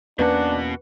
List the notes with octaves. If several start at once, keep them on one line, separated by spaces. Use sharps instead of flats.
E2 B2 A#3 C#4 D4 B4 F#5